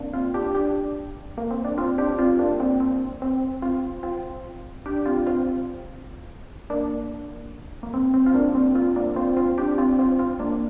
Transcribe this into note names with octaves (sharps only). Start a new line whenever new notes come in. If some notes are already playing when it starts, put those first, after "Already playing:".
Already playing: A#3 C4 D4
C4 F4
D4 G4
D4 G4
A#3
C4
D4
C4 F4
D4 G4
C4 F4
A#3 D4
C4
C4
C4
C4 F4
C4 F4
D4 G4
C4 F4
C4 F4
A#3 D4
A#3
C4
C4
F4
A#3 D4
C4
C4 F4
A#3 D4
C4 F4
C4 F4
D4 G4
C4 F4
C4 F4
C4 F4
A#3 D4